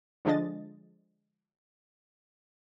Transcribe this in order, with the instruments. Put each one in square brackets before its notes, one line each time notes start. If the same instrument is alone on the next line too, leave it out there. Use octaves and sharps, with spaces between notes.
[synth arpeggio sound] D3 F3 G#3 D4 D#5 A6